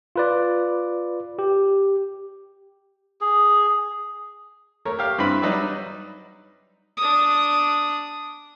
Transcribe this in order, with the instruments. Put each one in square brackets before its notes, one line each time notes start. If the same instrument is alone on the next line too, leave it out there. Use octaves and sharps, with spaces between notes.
[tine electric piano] F4 B4 D5
G4
[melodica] G#4
[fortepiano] A3 A#4 C#5
G4 F5
G2 C4 E4 B4 B5
F#3 G3 D#4 B4 D5 E5
[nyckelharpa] D4 D#6